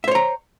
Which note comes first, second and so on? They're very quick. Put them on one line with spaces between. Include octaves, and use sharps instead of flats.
E5 C5 C#5 A#5